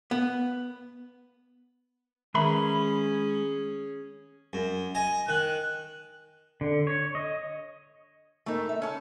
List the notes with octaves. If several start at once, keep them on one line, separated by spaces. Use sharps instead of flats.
B3
D#3 G#3 C#4 G#4 B4 E5 A#5 B5
F#2
D#5 G#5
D#3 F#6
D3
C#5
D#5
G#2 A3 A#3 C4 D#4
E5
C#4 A4